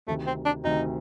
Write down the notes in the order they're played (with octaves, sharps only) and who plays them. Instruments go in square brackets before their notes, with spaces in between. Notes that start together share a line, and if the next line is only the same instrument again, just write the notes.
[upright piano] D2 C3 D#3 [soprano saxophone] A3
[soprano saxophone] C4
D4
[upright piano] D2 C3 D#3 [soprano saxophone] D#4